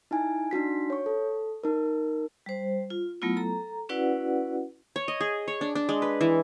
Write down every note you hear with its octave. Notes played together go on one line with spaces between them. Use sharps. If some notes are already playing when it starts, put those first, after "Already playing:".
D#4 E4 G#5
D4 D#4 F#4 B6
C#5 C#6
A4
D#4 A#4
G3 C5
F4
F#3 A3 B3 E4 F4
A4 A#5
C#4 E4 F#4 B4 D5 F#5
C#5
D#5
G#4
C#5
D4
D4
G#3
B4
E3